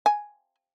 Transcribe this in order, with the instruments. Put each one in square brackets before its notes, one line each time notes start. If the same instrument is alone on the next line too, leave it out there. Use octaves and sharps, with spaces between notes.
[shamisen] G#5